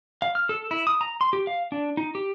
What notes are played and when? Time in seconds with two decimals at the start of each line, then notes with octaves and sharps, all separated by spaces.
0.22 F5
0.35 F6
0.49 A4
0.71 E4
0.87 D#6
1.01 A#5
1.21 C6
1.33 G4
1.47 F5
1.72 D4
1.97 D#4
2.15 G4